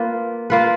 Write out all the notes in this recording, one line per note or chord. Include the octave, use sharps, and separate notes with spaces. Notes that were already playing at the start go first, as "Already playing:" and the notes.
Already playing: A#3 F4 B4
A#3 F4 B4